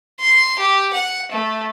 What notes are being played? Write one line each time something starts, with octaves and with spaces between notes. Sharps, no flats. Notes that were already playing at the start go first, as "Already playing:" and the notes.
C6
G4
F#5
A3